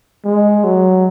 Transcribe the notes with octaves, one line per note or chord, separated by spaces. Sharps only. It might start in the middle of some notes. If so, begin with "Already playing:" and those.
G#3
F#3